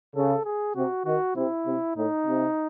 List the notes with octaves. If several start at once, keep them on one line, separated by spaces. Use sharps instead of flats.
C#3 A4
G#4
C3 F#4
D#3 F#4
C3 E4
C3
A2 D#4
C3